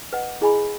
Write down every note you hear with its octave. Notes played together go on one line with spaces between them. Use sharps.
B4 D#5 F#5
E4 G#4 D#5 G#5 B5